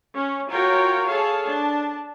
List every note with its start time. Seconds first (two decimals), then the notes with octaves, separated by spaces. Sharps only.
0.14 C#4
0.50 F4 F#4 A#4 C#5 G5 A#5
1.08 G#4 A4 C#5 F5 A5
1.47 D4 A5